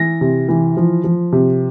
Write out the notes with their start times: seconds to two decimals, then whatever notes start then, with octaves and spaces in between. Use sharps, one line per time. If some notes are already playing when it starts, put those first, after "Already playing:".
Already playing: E3 A#6
0.21 C3
0.49 E3
0.77 F3
1.04 F3
1.32 C3